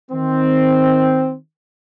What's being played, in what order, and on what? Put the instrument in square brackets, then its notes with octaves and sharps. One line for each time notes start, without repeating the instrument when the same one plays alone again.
[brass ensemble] D#3 C4